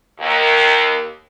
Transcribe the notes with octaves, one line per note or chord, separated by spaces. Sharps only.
D#2